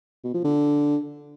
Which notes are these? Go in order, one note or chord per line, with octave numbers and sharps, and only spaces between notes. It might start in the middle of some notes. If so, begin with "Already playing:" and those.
B2
F3
D3